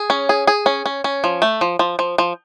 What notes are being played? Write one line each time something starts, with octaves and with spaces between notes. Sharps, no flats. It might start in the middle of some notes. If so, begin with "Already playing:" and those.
Already playing: G#4
C#4
G#4
G#4
C#4
C#4
C#4
F3
A3
F3
F3
F3
F3